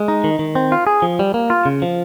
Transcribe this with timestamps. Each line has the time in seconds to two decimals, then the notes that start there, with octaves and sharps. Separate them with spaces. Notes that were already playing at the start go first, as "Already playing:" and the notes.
Already playing: G#3
0.08 D#4
0.24 D#3
0.39 D#3
0.55 C4
0.72 F4
0.87 G#4
1.02 F3
1.19 G3
1.34 A#3
1.50 F4
1.66 C#3
1.82 F3